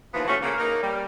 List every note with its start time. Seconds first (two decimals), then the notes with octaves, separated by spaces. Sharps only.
0.13 D#2 E3 F3 B3
0.26 A2 A3 C#4 F#4
0.41 C#3 A#3
0.58 A#3 D#4 A#4
0.82 G3